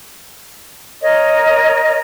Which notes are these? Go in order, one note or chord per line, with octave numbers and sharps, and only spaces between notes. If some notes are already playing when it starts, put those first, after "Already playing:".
A#4 C#5 D#5